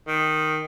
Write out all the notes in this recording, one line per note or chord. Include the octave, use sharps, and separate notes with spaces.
D#3